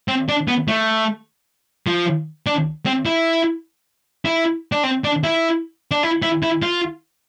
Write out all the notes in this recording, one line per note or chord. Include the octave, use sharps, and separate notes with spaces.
C4
D4
B3
A3
F3
D4
C4
E4
E4
D4
C4
D4
E4
D4
E4
E4
E4
F4